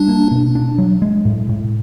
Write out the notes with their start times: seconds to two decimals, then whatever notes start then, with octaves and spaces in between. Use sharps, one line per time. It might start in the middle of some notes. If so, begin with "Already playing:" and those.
Already playing: G3 D4
0.08 A#3
0.31 B2
0.55 D4
0.78 F#3
1.02 G#3
1.25 A2
1.49 A2